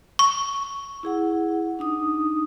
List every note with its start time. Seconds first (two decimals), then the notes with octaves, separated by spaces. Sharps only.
0.19 C#6
1.03 E4 G#4 F#5
1.79 D4 D#4 D#6